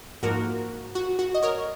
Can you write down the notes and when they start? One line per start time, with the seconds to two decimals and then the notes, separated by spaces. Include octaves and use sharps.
0.23 G#2 F3 A#3 F#4 A#4
0.95 F#4
1.19 F#4
1.34 D#5
1.42 A#4 C#5